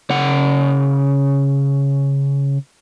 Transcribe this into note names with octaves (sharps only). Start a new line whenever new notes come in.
C#3 F#5